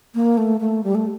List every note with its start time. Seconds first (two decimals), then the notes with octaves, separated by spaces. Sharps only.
0.15 A#3
0.37 A3
0.60 A3
0.84 G3
0.95 A3